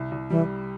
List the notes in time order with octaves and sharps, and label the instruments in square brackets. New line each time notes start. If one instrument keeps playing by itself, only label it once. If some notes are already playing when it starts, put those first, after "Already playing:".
Already playing: [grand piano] C2
C2
[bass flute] E3 [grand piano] G3